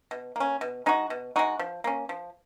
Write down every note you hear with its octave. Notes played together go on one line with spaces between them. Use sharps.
B2
A#3 C#4
B2
G#3 D#4 F#4
B2
G#3 D#4 F#4
F3
A#3 C#4
F3